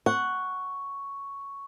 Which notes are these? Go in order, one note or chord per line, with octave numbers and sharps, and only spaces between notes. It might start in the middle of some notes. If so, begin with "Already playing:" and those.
F#5 C#6